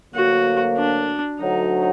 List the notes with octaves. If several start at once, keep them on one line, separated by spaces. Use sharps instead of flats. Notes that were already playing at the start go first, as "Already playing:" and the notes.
D2 D3 F#3 A#3 F#4
D4
D2 D3 F#3 D#4